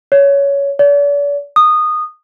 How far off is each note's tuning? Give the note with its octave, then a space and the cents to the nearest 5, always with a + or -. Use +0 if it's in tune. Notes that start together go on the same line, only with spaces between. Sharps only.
C#5 +15
D5 -45
D#6 -15